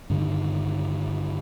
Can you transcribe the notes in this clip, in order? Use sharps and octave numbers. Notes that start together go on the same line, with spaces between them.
G2 D3 D#3